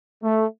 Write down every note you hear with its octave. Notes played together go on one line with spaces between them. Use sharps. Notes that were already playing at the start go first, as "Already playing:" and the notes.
A3